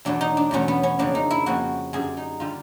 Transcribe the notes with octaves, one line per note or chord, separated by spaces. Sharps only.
E2 B2 F#3 A3 D4
D#4
D4
E2 B2 F#3 A3 C#4
B3
C#4
F2 C#3 F3 A#3 D4
D#4
E4
F2 C#3 F3 A#3 F#4
F#2 D3 G3 G#4
D#4
D3 G3 F4